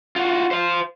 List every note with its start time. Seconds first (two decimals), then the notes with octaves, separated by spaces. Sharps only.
0.16 F4 F#4
0.51 C5 F5